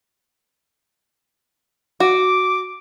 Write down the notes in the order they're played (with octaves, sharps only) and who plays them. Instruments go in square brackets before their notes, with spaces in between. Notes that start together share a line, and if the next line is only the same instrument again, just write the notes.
[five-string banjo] F#4 [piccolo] D6